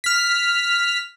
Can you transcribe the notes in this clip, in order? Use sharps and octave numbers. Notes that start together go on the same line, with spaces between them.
F6 B6